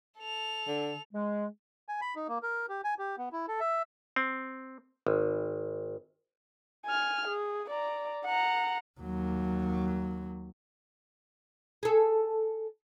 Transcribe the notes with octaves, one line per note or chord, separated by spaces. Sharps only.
A4 F7
D3
G#3
G#5
B5
D#4
A#3
A#4
G4
G#5
G4
B3
E4
A4
E5
C4
G#1
G#5 F6
G#4
D5 A#5
F#5 A#5
D#2 F#3
G#4 A4